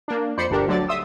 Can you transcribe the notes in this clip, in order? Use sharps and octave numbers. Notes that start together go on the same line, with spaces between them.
A#3 D4
F2 C5 D5 B5 C6 C#7
G1 D2 D4 G4 A#4
D2 D3 F#3 D5 A6
E5 C6 D#6 E6